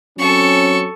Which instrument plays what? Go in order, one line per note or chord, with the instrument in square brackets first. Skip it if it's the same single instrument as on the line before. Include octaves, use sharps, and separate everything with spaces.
[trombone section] F#3 C4 C#4 [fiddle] A4 C#6